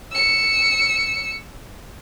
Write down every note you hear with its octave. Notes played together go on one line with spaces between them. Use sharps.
E6 C#7